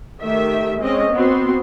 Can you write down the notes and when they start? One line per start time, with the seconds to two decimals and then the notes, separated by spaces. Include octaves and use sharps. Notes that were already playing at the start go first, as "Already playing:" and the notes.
0.21 D#3 A3 G4 E5
0.80 G#3 C4 C#4 D#5
1.12 B3 C4 F#4 C6